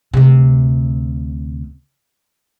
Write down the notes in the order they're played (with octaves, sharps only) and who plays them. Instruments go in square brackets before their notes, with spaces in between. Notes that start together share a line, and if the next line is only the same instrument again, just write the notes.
[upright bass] D2 C3